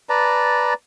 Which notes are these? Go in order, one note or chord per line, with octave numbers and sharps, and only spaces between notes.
B4 D5 A5 A#5